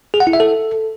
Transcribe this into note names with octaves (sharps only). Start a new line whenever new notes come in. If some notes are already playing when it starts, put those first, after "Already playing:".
G#4
F#5
E4
E5
A4